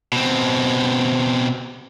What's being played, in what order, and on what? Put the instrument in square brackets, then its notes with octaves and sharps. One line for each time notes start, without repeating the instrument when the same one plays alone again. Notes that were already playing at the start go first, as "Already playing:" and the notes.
[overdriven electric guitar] B2 C4